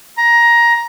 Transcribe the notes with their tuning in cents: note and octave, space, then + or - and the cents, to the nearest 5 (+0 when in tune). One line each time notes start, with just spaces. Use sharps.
A#5 +15